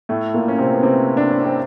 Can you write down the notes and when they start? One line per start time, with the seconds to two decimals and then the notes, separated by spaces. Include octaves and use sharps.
0.09 A2 A3
0.34 A#2 A#3
0.48 C#4
0.58 C3 C4
0.73 B3
0.83 C3 C4
1.17 D4
1.31 C#4
1.44 C4